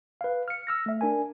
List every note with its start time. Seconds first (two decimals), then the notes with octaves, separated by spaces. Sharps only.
0.21 B4 F5
0.48 F6 C#7
0.67 E6 F6 A#6
0.86 A3 E5
1.01 D4 A#4 G#5